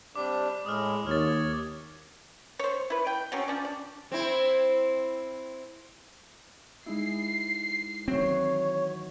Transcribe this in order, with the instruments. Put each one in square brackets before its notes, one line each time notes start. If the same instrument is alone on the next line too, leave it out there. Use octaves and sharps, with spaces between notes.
[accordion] C3 G3 D4 [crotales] D6
[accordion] A2 G#3 [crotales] D#6 F6
[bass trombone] D#2 [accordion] C#5 [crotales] F6 A6
[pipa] C5 C#5
E4 B4
G5
F#3 C4 C#4
F3 C#4 D4
D4
[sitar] C4 E4
[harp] G#3 D#4 E4 [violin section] C7
[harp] D#3 E3 F#3 [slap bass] C4 [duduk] C#5